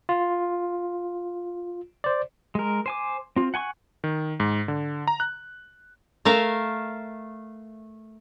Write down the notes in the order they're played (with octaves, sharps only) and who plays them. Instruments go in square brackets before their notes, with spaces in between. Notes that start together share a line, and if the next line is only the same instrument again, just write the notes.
[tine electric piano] F4
C5 D5
[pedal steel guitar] G#3 A#4
C5 G#5 D6
C4 F4
F#5 G#5 C6 C#6
[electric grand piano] D#3
G#2
D3
A#5
F#6
[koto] A3 A#4 E5 F5